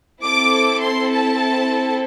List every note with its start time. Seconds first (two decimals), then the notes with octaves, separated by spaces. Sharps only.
0.23 C4 E4 A4 D6
0.82 C6
1.12 A5